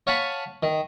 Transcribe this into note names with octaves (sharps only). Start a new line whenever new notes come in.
C#5 F5 F#5 G#5 A5 B5
D#3